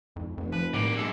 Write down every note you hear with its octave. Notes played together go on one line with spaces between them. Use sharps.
F2 G#2
F1 F2
F3 B4
A2 G3 A#3 D6
F#2 G#3 A4